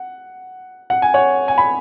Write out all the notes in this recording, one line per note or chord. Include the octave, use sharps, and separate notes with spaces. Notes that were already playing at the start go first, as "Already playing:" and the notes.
Already playing: F#5
F#5
G#5
C#5 F#5
G#5
B5